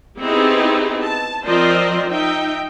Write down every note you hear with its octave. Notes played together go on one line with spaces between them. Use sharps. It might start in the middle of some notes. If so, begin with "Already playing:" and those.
B3 C4 D#4 E4 G4 G#4
A5
F3 C4 A#4 C5 D5 D#5
D#4 E5 G5